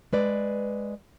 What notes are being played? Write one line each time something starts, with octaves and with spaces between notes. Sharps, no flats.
G#3 B4 D5